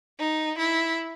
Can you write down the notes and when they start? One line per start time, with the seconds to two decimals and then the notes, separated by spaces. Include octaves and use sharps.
0.19 D#4
0.58 E4